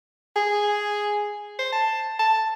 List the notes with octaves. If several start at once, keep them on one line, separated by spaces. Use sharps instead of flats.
G#4
C5
A5
A5